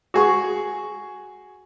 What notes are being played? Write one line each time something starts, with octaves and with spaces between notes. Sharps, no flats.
F#4 G#4 C#6